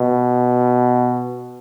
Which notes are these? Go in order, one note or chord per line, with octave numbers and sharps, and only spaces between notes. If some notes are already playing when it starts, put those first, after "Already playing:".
Already playing: B2